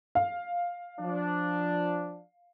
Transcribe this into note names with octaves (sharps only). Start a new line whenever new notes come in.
F5
F3 D4